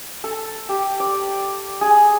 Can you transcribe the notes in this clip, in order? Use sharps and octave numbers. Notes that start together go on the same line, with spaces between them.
A4
G4
D5
G#4